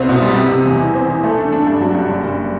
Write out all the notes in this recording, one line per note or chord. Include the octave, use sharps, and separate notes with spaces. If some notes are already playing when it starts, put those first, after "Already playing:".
Already playing: C2 C4
B2
G3
C3
C3
E2
E3
C4
E3
A3
D4
D4
G2
F#3
G2
F#1
F#1